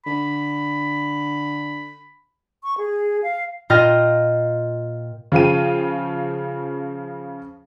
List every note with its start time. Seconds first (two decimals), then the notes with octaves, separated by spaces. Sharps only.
0.06 D3 B5
2.63 C#6
2.78 G#4
3.23 F5
3.70 A#2 F4 D#5 G5 F6 A#6
5.32 C#3 F3 F5 G5 D#7